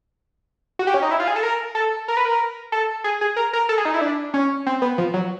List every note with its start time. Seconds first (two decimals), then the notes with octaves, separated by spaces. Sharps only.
0.79 F#4
0.87 G4
0.94 C#4
1.02 D#4
1.11 E4
1.20 F4
1.27 G#4
1.36 A4
1.43 A#4
1.75 A4
2.08 A#4
2.17 B4
2.25 A#4
2.72 A4
3.04 G#4
3.21 G#4
3.36 A#4
3.53 A#4
3.69 A4
3.78 G#4
3.85 D#4
3.94 E4
4.01 D4
4.34 C#4
4.66 C4
4.82 B3
4.98 F3
5.14 F#3